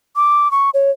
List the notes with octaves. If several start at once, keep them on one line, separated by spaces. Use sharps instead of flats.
D6
C#6
C#5